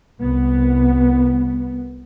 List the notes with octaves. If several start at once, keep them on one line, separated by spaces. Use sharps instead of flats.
C2 B3